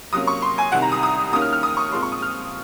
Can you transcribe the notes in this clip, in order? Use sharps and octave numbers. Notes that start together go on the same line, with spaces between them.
C3 F#3 A#3 C#4 D#6
C#6
C6
G#5
C2 C3 D#3 F#5
A#5
D#6
D#6
D#2 D#3 A#3 C#4 D#6
F6
F6
D#6
C#6
A#2 F3 G#3 C4 C6
C#6
D#6
F6